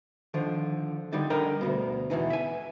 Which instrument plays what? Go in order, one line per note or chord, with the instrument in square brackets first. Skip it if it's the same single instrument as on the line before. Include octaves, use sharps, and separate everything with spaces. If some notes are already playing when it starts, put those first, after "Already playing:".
[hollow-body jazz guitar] D3 D#3 F3
D3 G3 D#4 D5
D3 G3 A#4 D#5 G5
D2 G2 B2
E2 B2 E3 D#4
E5 G#5